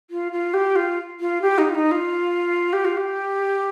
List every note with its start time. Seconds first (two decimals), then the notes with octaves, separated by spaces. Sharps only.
0.10 F4
0.32 F4
0.53 G4
0.75 F4
1.20 F4
1.42 G4
1.58 D#4
1.68 F4
1.75 D#4
1.91 F4
2.73 G4
2.85 F4
2.97 G4